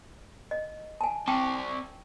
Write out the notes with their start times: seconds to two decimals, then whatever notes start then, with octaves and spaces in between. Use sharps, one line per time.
0.51 D#5
1.01 G#5 A5
1.28 C4 D5 G5 A5